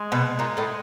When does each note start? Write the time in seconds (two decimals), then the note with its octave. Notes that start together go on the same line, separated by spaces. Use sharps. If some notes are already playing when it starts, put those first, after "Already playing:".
Already playing: G#3
0.12 B2 B3
0.39 A#2 A#3
0.57 A2 A3